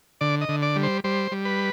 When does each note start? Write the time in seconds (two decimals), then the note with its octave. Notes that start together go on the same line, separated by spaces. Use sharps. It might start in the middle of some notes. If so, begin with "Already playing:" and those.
0.21 D3 D5
0.41 D#5
0.49 D3
0.62 D5
0.76 G3
0.83 C5
1.04 G3 C5
1.32 G3
1.45 B4